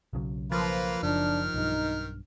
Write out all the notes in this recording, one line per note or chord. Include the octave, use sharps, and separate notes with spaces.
B1 C#3 F#3
F3 A#3 F4 B4
F#1 D#3 D4 F6
B1 G2 D#4